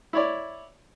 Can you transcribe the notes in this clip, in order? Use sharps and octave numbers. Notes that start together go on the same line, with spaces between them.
E4 C#5 D5